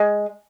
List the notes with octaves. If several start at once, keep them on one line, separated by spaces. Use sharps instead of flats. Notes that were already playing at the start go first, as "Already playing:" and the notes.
Already playing: G#3